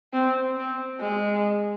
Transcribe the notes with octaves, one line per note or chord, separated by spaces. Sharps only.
C4
C4
G#3